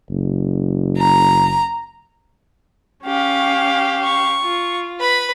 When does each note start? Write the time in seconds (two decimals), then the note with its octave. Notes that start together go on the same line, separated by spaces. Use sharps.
0.10 F#1
0.98 A#5
3.04 C#4 G4 F5
4.04 C#6
4.42 F4
5.00 B4 B5